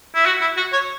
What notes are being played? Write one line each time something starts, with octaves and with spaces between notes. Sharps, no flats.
E4
F#4
E4
F#4
C#5